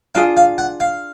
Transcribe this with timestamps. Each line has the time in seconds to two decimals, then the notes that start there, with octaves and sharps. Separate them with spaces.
0.15 D4 F4 G#4 F5
0.37 F5
0.58 F#5
0.80 F5